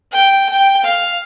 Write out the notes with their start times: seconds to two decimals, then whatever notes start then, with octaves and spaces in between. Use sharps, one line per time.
0.12 G5
0.49 G5
0.84 F5